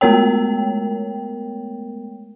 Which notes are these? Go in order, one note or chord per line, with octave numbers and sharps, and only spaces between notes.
G#3 A3 B3 A#4 C#5 G5